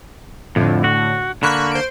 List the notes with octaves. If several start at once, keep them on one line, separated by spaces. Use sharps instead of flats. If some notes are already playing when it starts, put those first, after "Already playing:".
F2 A2 D3
F#4
D3 A#3 B5 C#6 F#6
C5 D7